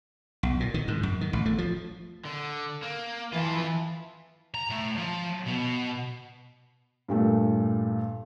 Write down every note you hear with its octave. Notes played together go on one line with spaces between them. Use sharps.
B1
A#2
D#3
G#2
F#2
D#3
A1
A3
F3
D3
A#3
E3 F4 A4
A#5
A2 A3
F3
B2
G2 A#2 A3